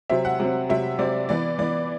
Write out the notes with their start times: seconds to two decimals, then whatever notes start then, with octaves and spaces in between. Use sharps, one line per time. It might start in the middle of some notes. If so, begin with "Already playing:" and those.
0.10 C3 F#3 C4 E5
0.25 F#5
0.40 C3 F#3 C4
0.69 C3 F#3 C4 E5
0.99 C3 F#3 C4 D5
1.29 E3 B3 D5
1.58 E3 B3 D5